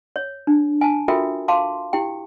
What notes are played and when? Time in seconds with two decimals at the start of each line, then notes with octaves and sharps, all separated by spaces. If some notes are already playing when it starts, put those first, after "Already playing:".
0.16 C#5
0.47 D4
0.81 G#5 A5
1.08 F4 F#4 A4 A#4 E5 G5
1.48 F5 A5 C6 D6
1.93 E4 G4 G5